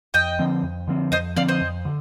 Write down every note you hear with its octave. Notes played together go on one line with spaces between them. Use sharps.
F2 D#5 G5
D3 F3 C4
F2
D3 F3 C4
F2 C5 D#5
D3 F3 C4 D5 F5
C5 D#5
F2
D3